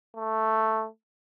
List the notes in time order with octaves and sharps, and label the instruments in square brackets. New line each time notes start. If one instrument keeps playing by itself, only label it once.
[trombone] A3